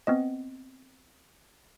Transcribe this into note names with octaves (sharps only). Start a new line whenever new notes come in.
B3 C4 D#5